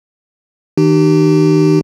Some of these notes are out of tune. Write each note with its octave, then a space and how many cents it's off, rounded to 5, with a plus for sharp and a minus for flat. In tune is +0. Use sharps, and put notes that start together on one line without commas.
D#3 +35 D#4 -45 G4 -25